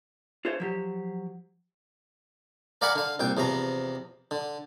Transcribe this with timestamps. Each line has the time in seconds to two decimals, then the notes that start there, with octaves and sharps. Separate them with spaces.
0.45 F4 G#4 A4 C5 C#5 E5
0.60 F3 F#3 G4
2.81 A#4 D5 F5 F#5 G#5 B5
2.95 D3 F5
3.20 C2 A#2 G5
3.37 E2 C3 F3 A#5
4.31 D3